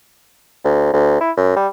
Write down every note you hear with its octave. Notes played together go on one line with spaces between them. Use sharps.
D2
D2
E4
F#2
G3